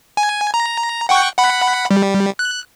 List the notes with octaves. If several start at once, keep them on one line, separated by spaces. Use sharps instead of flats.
G#5
A#5
F#5 G5 C#6
F#5 B5
G3
F#6